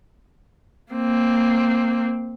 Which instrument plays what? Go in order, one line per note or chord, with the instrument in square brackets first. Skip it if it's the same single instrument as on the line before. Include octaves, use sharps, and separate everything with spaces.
[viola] A#3 C4